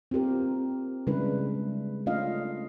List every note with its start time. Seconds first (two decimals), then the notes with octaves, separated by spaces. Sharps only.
0.11 C4 F4 G4 A#4
1.07 C#3 G3 G#3 D4 E4 B4
2.06 A3 C#4 D4 F4 D#5 F5